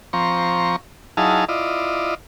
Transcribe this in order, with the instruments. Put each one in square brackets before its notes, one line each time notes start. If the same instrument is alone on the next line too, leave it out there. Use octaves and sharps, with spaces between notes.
[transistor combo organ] F3 C4 A#5 C#6
F#3 D#4 E4 G#4 F5 A5
E4 F4 D5 D#5